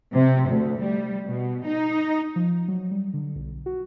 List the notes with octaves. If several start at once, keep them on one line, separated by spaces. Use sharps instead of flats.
C3
D2
G3
B2
D#4
F3
F#3
G3
D3
B1
F#4